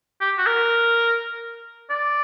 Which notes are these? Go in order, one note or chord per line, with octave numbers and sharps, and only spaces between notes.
G4
F#4
A#4
D5